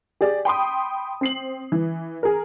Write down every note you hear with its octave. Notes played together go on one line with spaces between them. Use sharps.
G4 G#4 D5
G5 B5 C6 D#6
C4 C7 F#7
E3
G#4 A#4